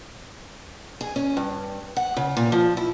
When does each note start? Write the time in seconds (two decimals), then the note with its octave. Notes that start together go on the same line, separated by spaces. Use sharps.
1.01 G#4
1.16 C#4
1.37 G2
1.97 F#5
2.17 C#3
2.37 A#2
2.52 F3
2.77 E4